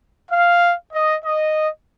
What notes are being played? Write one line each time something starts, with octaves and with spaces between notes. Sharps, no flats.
F5
D#5
D#5